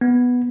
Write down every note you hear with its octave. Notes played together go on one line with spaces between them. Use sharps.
B3